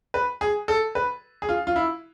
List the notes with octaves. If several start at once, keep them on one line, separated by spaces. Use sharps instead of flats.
B4
G#4
A4
B4
G#4
F4
F4
E4